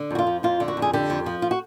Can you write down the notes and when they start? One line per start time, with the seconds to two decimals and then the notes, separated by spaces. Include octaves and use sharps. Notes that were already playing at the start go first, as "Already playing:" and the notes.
Already playing: D3
0.11 F2 F#4
0.19 F4
0.27 F3
0.43 F2 F4
0.60 D3
0.68 F#4
0.77 F2
0.82 G#4
0.93 D3 G4
1.10 F2
1.26 F3
1.42 F4
1.51 F#4